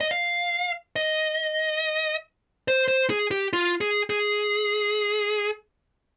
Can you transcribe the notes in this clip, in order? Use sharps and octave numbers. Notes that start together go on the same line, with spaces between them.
D#5
F5
D#5
C5
C5
G#4
G4
F4
G#4
G#4